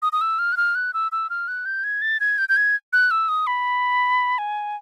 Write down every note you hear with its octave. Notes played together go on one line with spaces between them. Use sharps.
D#6
D#6
E6
F6
F#6
F6
F#6
E6
E6
F6
F#6
G6
G#6
A6
G#6
G6
G6
G#6
F#6
E6
D#6
B5
G#5